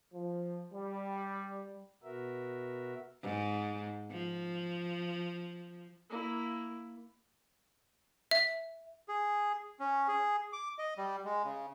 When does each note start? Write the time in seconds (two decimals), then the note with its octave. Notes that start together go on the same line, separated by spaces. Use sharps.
0.14 F3
0.74 G3
2.03 B2 B3 F#4 A#4 E5
3.22 G#2
4.11 F3
6.10 A#3 E4
8.31 E5
9.08 G#4
9.80 C#4
10.08 G#4
10.53 D6
10.79 D#5
10.98 G3
11.25 G#3
11.44 C#3